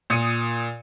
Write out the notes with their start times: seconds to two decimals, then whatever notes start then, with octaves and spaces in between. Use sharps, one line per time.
0.10 A#2 D#6 C#7 D#7